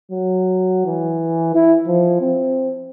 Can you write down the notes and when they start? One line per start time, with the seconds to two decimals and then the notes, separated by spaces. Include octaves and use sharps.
0.12 F#3
0.86 E3
1.55 E4
1.88 F3
2.21 C4